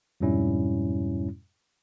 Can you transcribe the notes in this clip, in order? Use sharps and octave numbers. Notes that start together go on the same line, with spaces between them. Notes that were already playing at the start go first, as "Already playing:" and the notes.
F2 G#2 B2 G3 C#4 E4